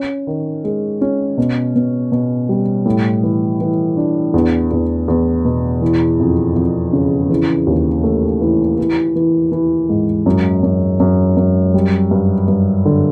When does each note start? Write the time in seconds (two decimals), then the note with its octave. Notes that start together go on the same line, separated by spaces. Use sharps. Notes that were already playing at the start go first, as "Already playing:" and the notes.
Already playing: C#4
0.27 D#3
0.64 G#3
1.01 C#4
1.38 B2
1.76 B2
2.12 B2
2.49 G3
2.86 A2
3.23 E3
3.61 E3
3.97 D4
4.34 E2
4.71 E2
5.08 E2
5.45 B2
5.81 E3
6.20 F2
6.56 F2
6.93 C#3
7.29 E3
7.67 D#2
8.03 A3
8.41 E3
8.78 E3
9.16 E3
9.52 E3
9.89 G#2
10.26 F#2
10.63 F#2
11.00 F#2
11.37 F#2
11.74 G3
12.11 G2
12.48 G2
12.85 D3